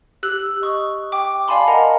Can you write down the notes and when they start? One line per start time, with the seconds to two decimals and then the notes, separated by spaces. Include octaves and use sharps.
0.23 G4 E6 F#6 F#7
0.62 D#5 C#6 D#6
1.12 G5 D6
1.48 D5 F5 G#5 A5 B5 C6
1.68 A#4 D#5 F#5 G#5 A#5